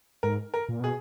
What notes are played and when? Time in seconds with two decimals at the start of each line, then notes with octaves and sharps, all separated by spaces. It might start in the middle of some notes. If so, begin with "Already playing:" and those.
0.23 G#2 A#4
0.54 A#4
0.69 A#2
0.80 B2 G#4